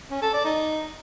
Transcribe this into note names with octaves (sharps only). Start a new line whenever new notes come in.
C#4
A4
D5
D#4